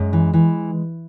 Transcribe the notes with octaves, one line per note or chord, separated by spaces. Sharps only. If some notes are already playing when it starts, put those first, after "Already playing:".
Already playing: F#2 G#3
E3
E3